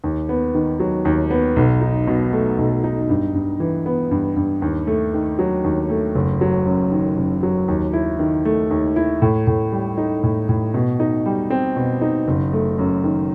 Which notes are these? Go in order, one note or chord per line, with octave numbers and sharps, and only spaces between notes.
D#2
B3
D#3
F#3
D#2
B3
B1
D#4
B2
A3
B1
D#4
G2
G2
E3
B3
G2
G2
D#2
A3
D#3
F#3
D#2
A3
F#1
F#3
F#2
D#3
F#1
F#3
D#2
E4
D#3
A3
D#2
E4
A2
A2
G3
D#4
A2
A2
B2
D#4
G3
C4
B2
D#4
F#1
A3
F#2
D#3